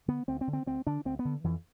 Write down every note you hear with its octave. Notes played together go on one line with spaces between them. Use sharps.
D3 B3
D2 C4
C4
D3
C4
D2 C4
D3 D4
D2 C4
B3
D3
F2 E3